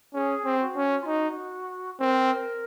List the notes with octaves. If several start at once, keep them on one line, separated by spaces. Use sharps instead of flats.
C#4 G#4
C4
F#4
C#4
F4
D#4 F#4
C4 A#4